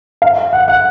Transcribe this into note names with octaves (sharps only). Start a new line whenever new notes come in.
F5
F5
F#5
F#5